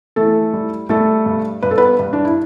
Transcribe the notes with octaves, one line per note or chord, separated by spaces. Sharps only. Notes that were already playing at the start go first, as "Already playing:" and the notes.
E3 A3 A4
G3
G3 A3 A4
G2
G2 B4
A4
B3 B4
G2
D4
E4